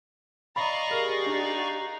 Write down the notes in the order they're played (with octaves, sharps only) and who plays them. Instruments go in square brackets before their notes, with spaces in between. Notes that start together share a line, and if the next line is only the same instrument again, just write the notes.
[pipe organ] D5 F5 C#6 [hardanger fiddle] D#5 A#5 [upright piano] B5
[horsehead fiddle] G4 G#4 [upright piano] A#4
[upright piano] D4 [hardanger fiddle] D#4